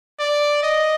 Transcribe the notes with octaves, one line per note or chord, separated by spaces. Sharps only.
D5
D#5